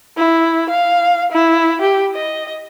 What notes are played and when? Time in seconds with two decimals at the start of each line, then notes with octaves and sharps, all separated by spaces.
0.17 E4
0.69 F5
1.32 E4
1.81 G4
2.14 D#5